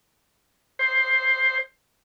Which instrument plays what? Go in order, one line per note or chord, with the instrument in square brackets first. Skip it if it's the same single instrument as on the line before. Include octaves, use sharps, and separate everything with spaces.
[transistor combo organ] C5